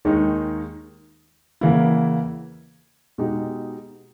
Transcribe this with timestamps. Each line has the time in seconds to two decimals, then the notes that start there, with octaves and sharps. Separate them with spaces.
0.05 D#2 D#3 G#3 D#4
1.61 E2 C#3 E3 A#3 E4
3.18 B2 G#3 D#4 G4